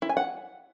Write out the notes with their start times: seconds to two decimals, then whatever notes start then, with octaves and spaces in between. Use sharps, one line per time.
0.02 E4
0.09 G#5
0.17 F#5